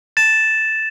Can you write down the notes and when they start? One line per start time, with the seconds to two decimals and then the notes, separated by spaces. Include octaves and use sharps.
0.17 A6 E7